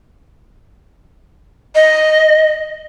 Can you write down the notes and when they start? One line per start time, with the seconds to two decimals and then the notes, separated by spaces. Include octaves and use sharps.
1.75 D#5